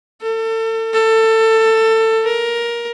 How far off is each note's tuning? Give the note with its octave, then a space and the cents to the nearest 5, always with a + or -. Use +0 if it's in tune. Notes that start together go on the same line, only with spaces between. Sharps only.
A4 +35
A4 +20
A#4 +15